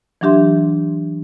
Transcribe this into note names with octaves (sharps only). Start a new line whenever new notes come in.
E3 F#3 D4 G4 E5 C6